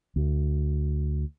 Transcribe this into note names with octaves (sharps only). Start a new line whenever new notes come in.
D2